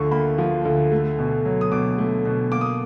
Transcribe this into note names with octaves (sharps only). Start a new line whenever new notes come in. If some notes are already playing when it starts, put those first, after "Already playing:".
Already playing: D2 D3 F3 C#6
A#3 B5
F3
D2
A3
B2
F#3
D#6
B2 D6
A3
B2
A#3 D6
D#6